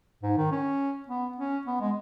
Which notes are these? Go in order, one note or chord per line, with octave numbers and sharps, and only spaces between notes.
G#2
D#3
C#4
B3
C#4
B3
G#3